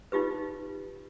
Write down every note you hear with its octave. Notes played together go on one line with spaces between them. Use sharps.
D#4 F4 G4 B4